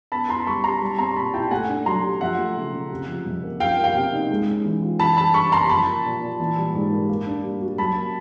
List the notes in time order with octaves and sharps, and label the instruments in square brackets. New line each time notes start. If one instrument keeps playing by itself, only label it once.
[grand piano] B3 [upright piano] A5 B5
[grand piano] E4 [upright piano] A#5 C6
[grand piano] G3 [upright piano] B5 C#6
[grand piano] G4 [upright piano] A#5 C6
[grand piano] G3
[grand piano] C4 [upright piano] A#5 C6
[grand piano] A#2 [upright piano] A5 B5
[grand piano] E4 [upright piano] G5 A5
[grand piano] A3 [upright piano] F#5 G#5
[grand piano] D4
[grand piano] F#3 [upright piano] A#5 C6
[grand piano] G4
[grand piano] F3 [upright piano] E5 F#5
[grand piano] A3
C#3
C#3
C3
F3
F2
A#3
[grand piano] F3 [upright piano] F5 G5
[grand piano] A#3
[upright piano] F5 G5
[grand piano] C3
D#4
G#3
C#4
E3
F4
[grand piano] E3 [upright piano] A5 B5
[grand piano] G3 [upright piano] A5 B5
[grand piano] G2 [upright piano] B5 C#6
[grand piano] A#3 [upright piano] A#5 C6
[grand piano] F3 [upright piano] A5 B5
[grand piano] A#3
A#2
A#2
E3
G3
G#2
A#3
A#3
D4
G3
F#4
[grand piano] F#3 [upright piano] A5 B5
[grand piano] A#3